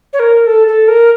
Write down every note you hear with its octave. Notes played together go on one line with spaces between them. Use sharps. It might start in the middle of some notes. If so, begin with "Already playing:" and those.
C#5
A#4
A4
A4
A#4